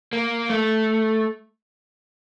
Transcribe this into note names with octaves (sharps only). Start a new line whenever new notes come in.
A#3
A3